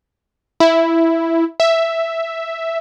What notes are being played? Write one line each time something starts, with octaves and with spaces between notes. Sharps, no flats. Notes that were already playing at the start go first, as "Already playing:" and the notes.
E4
E5